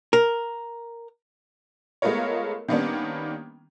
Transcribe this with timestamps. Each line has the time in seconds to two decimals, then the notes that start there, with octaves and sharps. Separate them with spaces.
0.13 A#4
2.02 G#3 A3 B3 F4 A#4 C#5
2.68 D#3 G3 A#3 B3 C#4 D4